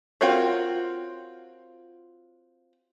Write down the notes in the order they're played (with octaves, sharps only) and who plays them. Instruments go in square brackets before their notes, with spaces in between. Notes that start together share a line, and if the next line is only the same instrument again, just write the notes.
[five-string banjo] C4 F4 F#4 A#4 C#5